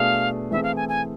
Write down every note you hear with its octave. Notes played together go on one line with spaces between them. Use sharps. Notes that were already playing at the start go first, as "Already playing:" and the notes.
Already playing: B2 A3 D4 G#4 F5
E3 A3 C4 E4 G#4 E5
F5
G#5
G#5